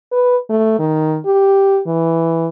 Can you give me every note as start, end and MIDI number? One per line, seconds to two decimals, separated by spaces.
0.12 0.36 71
0.50 0.77 57
0.79 1.18 51
1.25 1.81 67
1.87 2.48 52